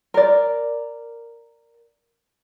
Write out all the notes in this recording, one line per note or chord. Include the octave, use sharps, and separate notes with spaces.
A#4 D5